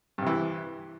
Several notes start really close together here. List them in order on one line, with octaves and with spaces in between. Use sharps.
G2 C3 E3